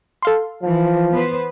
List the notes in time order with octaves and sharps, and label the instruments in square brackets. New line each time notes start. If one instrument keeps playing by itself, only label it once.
[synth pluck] A4 F5 C6
[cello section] E3 [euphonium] F3
[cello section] B3 B4 C5